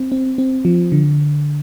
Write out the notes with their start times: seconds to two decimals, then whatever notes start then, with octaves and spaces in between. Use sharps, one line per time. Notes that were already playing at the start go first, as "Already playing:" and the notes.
Already playing: C4
0.12 C4
0.38 C4
0.65 F3
0.92 D3